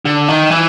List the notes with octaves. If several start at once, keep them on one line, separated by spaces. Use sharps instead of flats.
D3
D#3
E3